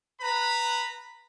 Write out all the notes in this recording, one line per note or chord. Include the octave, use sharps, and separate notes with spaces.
B4 A#5 B5